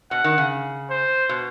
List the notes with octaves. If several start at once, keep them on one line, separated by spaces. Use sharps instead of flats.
B2 F#5
D#3
C#3
C5
B2